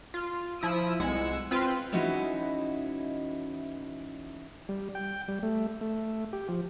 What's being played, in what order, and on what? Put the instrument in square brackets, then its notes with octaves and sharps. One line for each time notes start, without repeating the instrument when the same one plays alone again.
[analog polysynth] F4
F3 E4 D#6 E6 D7 D#7
C2 G#3 F#5 E6 G#6
C4 F4 B4 F5
[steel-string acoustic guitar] E3 G#3 C#4 D#4 E4 F#4
[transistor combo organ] G3
G5
G3
A3
A3
G4
F3